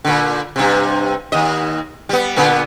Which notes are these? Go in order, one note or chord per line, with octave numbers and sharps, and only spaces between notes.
A#2 D3
G2 C3
D#2 D#5
G3 B3
A#2 D3 B3